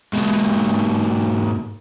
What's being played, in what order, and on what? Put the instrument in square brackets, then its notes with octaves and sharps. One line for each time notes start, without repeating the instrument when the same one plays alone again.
[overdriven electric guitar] G#2 B2